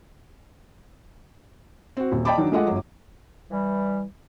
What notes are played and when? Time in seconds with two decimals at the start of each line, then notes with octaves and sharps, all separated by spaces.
1.97 C4 F#4
2.12 D#1
2.25 D5 D#5 G5 A5 B5 D6
2.37 D#3 F#3 D4 D#4
2.52 G#3 A3 F4 D#5 F#5
2.67 G1 F#3
3.51 E3 G3